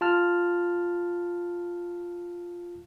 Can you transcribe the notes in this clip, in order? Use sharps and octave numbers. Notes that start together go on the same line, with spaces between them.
F4 A5 F6